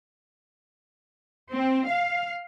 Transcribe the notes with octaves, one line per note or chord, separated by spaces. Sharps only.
C4
F5